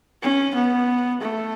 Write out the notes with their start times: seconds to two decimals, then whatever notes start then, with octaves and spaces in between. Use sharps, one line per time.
0.22 C#4
0.55 B3
1.21 A3